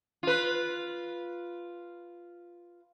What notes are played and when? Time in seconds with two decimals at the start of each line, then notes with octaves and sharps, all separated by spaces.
0.23 F4 B4